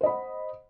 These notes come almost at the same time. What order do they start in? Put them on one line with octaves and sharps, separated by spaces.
C5 D#5 B5 F#5